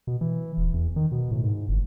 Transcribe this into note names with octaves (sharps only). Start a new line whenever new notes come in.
B2
E3
D#1
E2
D#3
B2
A2
G#2
G1